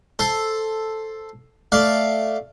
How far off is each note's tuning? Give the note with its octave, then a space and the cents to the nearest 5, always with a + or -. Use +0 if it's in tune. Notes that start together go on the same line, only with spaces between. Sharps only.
A4 +0 C5 +5
A3 +0 D5 +0 F5 +0